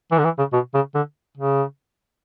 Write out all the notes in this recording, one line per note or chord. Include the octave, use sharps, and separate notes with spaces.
E3
D3
E3
C#3
B2
C#3
D3
C#3